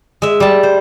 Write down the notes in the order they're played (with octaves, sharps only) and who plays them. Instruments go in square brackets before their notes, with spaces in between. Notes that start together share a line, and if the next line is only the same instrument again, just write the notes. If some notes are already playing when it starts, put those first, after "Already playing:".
[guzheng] G#3 E5
G3 A5
C5